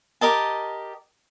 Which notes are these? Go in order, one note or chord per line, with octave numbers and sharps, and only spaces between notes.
G4 A#4 D#5 A5